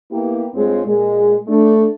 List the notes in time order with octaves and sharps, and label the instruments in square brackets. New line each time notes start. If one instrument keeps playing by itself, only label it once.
[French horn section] A#3 B3 E4 G4
G2 G#3 C4 F4 G#4 C#5
A#2 G#3
A3 D4